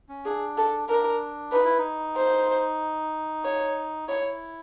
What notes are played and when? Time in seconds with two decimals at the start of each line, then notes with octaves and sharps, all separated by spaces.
0.09 C#4
0.25 D4 G#4
0.57 A4
0.89 D4 A#4
1.52 D#4 B4
1.65 E4
1.78 D#4
2.16 C5
3.44 C#5
4.08 E4 C#5